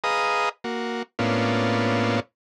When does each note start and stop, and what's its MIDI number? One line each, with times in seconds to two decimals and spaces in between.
0.04 0.49 68
0.04 0.49 71
0.04 0.49 75
0.04 0.49 77
0.04 0.49 82
0.04 0.49 87
0.64 1.03 58
0.64 1.03 66
1.19 2.20 45
1.19 2.20 58
1.19 2.20 59
1.19 2.20 61
1.19 2.20 62
1.19 2.20 65